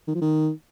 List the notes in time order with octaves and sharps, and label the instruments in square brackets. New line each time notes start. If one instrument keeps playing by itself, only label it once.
[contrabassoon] D#3
F3
D#3